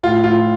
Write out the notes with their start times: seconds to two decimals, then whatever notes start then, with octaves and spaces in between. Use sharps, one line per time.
0.03 A2 F4
0.24 A2 F4